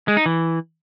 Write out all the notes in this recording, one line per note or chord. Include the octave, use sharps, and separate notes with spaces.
G#3
D#4
E3